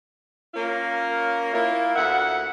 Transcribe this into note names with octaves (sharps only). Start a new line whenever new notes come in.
A#3 C#4 F4 A#4
A#3 E4 F4
D2 E5 F#5